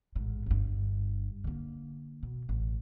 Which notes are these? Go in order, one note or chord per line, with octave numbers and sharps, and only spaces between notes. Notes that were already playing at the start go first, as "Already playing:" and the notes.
A1 G#2
G1 G2
D3 A#3
B2
A1